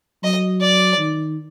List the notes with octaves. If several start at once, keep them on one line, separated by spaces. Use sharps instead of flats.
F#3 D#5
D5
D#3